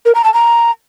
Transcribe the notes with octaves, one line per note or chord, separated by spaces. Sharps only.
A#4
A#5
A5
A#5